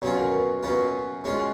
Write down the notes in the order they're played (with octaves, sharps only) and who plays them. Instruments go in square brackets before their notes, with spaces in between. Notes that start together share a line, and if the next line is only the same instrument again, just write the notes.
[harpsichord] B2 F#3 C#4 F4 [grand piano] C#5
[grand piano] A#4
B4
[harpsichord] B2 F#3 C#4 F4 [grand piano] B4
[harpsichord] B2 G#3 C#4 F4 [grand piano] C#5